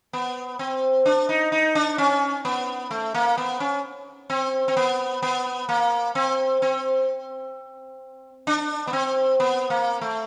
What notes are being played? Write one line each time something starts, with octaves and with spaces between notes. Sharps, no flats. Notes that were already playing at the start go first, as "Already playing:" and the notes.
B3
C4
D4
D#4
D#4
D4
C#4
B3
A3
A#3
B3
C#4
C4
C4
B3
B3
A#3
C4
C4
D4
B3
C4
B3
A#3
A3